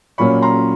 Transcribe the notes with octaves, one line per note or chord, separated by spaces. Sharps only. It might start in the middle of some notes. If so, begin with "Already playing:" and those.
A#2 F#3 A#3 C#4 B5 C#6
A#5 C6